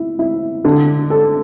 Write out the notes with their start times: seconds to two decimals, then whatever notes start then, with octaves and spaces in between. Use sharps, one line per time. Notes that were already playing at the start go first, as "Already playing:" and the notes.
Already playing: E4
0.19 E4
0.65 D3
1.10 A4